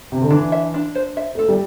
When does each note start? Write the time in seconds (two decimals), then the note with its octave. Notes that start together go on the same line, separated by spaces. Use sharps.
0.12 C3
0.21 D3
0.31 E3 D4
0.52 E5
0.74 D4
0.95 C5
1.17 E5
1.35 A3 A4
1.48 G3